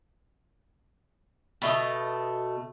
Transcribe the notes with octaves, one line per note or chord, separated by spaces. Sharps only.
B2 A3 D#5